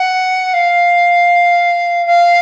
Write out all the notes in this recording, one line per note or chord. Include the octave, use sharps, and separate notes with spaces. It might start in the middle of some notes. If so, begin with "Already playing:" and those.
Already playing: F#5
F5
F5